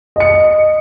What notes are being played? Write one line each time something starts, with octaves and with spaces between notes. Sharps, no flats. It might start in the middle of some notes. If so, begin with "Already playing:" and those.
D#5 C#7